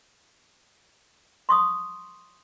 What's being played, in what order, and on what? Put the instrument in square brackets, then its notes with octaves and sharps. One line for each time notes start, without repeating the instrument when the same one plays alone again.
[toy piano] C6 C#6 D#6